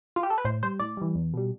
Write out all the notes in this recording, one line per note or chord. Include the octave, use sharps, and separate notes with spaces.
F4
G4
A4
B4
A2 C5
G3 C5
A2 D5
E3 G3
E2
B2 G3